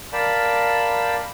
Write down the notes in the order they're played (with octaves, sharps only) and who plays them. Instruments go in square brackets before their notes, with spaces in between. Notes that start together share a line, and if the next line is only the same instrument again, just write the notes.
[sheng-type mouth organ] A#4 D5 F5 G5 A5 B5